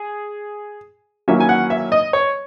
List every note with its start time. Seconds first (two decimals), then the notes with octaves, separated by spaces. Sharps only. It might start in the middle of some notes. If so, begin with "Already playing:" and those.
Already playing: G#4
1.28 D#3 F#3 A#3 C#4 E4 E5
1.40 G#5
1.49 F#5
1.70 E5
1.92 D#5
2.13 C#5